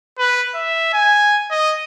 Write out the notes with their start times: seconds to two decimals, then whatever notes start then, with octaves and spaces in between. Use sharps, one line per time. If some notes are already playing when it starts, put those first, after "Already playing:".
0.18 B4
0.55 E5
0.93 G#5
1.51 D#5